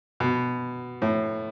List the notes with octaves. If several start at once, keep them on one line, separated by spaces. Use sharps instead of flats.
B2
A2